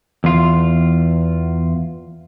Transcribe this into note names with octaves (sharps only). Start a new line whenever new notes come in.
E2 F4